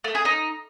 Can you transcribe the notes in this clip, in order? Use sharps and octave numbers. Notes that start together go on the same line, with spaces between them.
A3
G#4
D#4